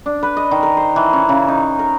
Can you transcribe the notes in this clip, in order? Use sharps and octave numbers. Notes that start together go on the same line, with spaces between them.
D4
B4
D#5
D#3
A#4
C5
E3
C#4
C#3
D#4
A#4